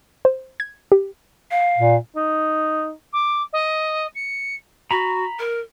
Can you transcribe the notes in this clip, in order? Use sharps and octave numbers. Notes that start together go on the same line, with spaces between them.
C5
G#6
G4
F5
A#2
D#4
D6
D#5
C#7
F#4 A#5 B5
A#4